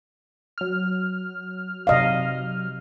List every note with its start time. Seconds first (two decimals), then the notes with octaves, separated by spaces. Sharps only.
0.58 F#3 F6
1.87 C3 D#5 F5